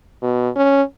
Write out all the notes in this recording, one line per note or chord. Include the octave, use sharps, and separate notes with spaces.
B2
C#4